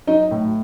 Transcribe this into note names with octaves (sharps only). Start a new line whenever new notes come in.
F#3 D#4 D#5
A2